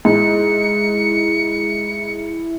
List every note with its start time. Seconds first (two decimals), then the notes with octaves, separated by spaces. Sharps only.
0.05 G#2 E4 C#7